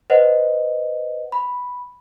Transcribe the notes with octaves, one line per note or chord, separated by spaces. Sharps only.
B4 C5 D#5 F#5
B5